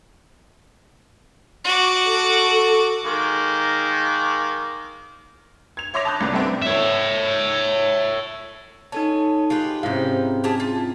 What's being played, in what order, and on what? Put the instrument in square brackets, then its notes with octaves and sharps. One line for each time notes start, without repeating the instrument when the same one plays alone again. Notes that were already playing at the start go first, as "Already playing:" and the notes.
[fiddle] F#4 D6
[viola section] A4
[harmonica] D#3 G#3 A#3
[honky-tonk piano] G#6 F7
C#5 E5 C6 D6 A#6 F7
A5 B5 D#6 F#6 G6
G1 C2 C3 B3 B4 D5
C3 G3 A3 B3 C4 D4
[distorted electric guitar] C#5 E5
[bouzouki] C#4 [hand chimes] D#4 A4 A5
[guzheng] G#3 [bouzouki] F4 G4 B4
[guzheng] G#2 C3 [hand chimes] C#4 E4 F5
[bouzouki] G4 G#4 A5
F4